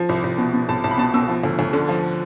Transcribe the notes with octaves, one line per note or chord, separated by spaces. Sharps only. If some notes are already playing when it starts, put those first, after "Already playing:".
Already playing: F3
C2
C2
B2
B2
C2 A5
C2 A5
B5
B2 A5
B2 E6
F3
D2
D2
D3
F3